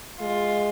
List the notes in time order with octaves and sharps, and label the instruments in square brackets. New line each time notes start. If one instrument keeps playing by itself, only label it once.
[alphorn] G#3 [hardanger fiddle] F4